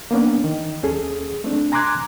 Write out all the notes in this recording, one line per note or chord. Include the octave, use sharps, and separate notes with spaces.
A#3 B3 C#4 D4
D#3
D#2 C#4 G#4 A4
A3 C4 D4
G#5 A#5 C6 D6 F#6 G#6